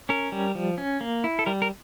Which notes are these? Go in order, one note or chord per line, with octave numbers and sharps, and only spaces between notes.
C#4 A#4
G3
F3
C#4
A#3
E4
A4
G3 A#4
A#4